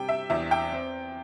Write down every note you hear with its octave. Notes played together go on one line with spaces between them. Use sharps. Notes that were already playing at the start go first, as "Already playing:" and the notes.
Already playing: C3 G3 G5
E5
E2 E5
G5
C4